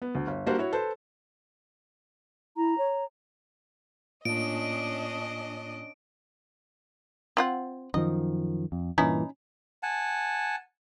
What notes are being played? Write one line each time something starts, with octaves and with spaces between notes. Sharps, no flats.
B3
D2
G1
G3 A#3 D4 F#4 C5
E4 F#4 C#5
A4 B4 C5
E4 A#5
C#5
A2 A#3 C#4 D4 F4 D#5 D7
C4 F4 F#5
F#2 D#3 F3 D#5
F2
G2 A#2 E3 C#4 D#4 E4
F#5 G#5 A5